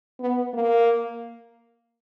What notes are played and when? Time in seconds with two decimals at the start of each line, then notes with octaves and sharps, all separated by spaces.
0.20 B3
0.53 A#3